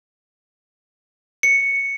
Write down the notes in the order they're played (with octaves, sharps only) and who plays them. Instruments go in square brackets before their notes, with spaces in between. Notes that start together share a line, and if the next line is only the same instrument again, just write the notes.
[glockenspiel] C#7